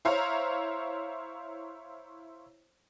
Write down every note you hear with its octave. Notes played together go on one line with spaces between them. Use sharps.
E4 C5 C#5 F5 A#5